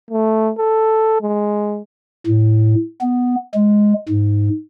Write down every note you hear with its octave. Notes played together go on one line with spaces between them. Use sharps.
A3
A4
G#3
A2
B3
G#3
G#2